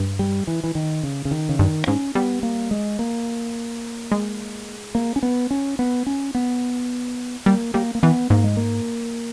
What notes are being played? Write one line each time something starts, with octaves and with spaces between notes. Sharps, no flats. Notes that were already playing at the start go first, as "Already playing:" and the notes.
Already playing: G2
G3
E3
E3
D#3
C#3
C#3
D#3
C#3
G2 D#3
G#2 C#4
G3 B3
A#3
G#3
A#3
G#3
A#3
C#4
B3
C#4
B3
C#4
B3
G3 A#3
G3 A#3
A#3
E3 B3
G#2 A#3
G#3
A#3